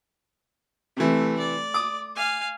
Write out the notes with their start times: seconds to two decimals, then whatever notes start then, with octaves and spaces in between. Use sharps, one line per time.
0.97 C3 E3 A3
1.39 D5
1.74 D6 D#6
2.16 F5 G#5